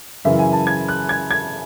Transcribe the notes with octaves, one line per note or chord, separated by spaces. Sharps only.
F#2 C#3 E3 E5
G#5
A5
G#6
F#6
G#6
G#6